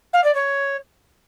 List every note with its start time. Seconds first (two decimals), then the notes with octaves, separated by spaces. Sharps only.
0.13 F5
0.24 D5
0.34 C#5